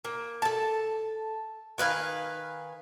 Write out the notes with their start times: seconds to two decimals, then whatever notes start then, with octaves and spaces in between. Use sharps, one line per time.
0.05 A#3
0.42 A4 A5
1.78 D#3 B4 F5 G#5